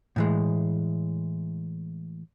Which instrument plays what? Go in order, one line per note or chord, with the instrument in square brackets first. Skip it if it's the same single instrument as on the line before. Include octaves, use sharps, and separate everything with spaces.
[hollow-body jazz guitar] A2 E3 G#3